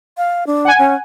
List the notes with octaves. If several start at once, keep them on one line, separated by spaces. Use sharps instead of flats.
F5
D4
F#5 G#5
C#4